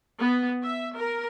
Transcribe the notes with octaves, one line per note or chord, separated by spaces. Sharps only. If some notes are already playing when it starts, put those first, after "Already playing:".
B3
E5
A#4